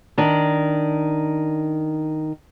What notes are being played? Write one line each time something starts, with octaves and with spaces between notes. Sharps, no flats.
D#3 D4